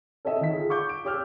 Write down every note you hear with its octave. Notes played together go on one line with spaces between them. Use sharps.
A4 C#5 D#5 E5
D#3 B6
F4 G#4
F5 C#6 D6 G6
D7
G4 C#5 D6 E6 F6 G6